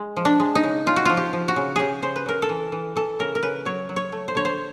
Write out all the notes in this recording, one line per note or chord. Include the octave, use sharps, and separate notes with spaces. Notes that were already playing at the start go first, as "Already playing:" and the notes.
Already playing: G#3
F3
D4
G#3
D#4
C#3
C#3 F4
F#4
F3 F4
G4
F3
F#4
C#3
C#3 G4 G#4
C#3 C5
B4
C#3 A#4
A4
E3
E3
E3 A4
C#3 A#4
A#4
C#3 B4
F#3 C#5
F#3
C#5
A3
C5
D3 C#5
C5